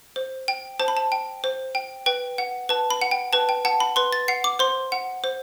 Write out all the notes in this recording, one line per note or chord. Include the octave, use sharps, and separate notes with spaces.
C5
G5
C5 A5
B5
A5
G5
C5
G5
B4 G5
F#5
B4 A5
B5
F#5
G5
B4 A5
G5
F#5 A5
B5
B4 C6
A6
F#5 C7
D6
C5 C6
F#5
C5